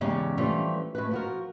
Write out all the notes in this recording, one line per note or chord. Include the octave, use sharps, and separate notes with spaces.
E2 G#2 C#3 C#4 G4 D5
E3 F3 G3 A3 C#4 D4
A2 C#4 B4
F3 F#4 A#4